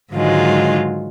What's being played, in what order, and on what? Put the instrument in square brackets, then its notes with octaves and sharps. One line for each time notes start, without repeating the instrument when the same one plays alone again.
[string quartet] G#2 D3 D#3 F#3 G#3 F4